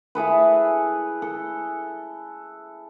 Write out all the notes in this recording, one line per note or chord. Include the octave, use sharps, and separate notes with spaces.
E4 G#4 A4 B4
A4